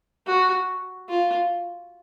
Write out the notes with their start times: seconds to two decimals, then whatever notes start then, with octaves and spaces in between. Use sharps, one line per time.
0.27 F#4
1.09 F4